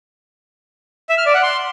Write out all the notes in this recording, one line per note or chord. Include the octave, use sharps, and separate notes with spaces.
E5
F6
D5
F#5
C6